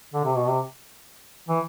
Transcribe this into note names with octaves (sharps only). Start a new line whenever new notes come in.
D3
C3
B2
C3
E3